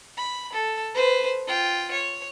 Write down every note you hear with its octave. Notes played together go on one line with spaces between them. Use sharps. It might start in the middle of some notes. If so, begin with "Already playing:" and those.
B5
A4
B4 C5
F4 G5
C#5